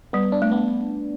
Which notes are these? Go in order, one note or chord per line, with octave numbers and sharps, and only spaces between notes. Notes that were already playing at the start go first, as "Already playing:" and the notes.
G3 B3
D4
A3
B3